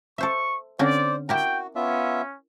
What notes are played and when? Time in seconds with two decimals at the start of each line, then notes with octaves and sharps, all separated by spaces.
0.18 A4 C5 E5 C#6
0.79 D3 C4 C#4 C5 D5
1.29 E4 F#4 G4 A#4 G5
1.75 B3 C#4 F4 E5